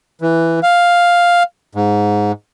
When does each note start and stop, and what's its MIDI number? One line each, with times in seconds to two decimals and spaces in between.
0.22 0.60 52
0.63 1.43 77
1.75 2.32 44